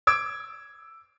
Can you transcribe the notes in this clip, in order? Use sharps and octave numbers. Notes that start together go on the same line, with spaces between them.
D6 E6 G#6 D7